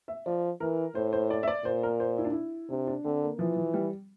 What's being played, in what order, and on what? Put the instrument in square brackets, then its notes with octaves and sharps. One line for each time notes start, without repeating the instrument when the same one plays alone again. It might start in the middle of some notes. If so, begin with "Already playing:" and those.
[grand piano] E5
[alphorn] F3 [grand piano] D5
[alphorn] E3 [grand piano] A#4
[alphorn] A2 [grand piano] C5
[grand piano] C5
D5
E5
D5
[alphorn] A#2 [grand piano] C5
[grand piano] A#4
C5
E4
D4
E4
[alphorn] C3 [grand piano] D4
[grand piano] D4
[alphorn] D3 [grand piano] C4
[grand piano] A#3
[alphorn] E3 [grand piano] F3
[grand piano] F3
G3